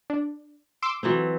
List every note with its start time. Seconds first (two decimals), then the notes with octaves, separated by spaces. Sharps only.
0.10 D4
0.82 C6 D6 E6
1.03 E3 F#3 C4